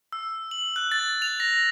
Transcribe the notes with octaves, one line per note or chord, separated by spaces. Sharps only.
E6
F#7
F#6
A6
F7
A#6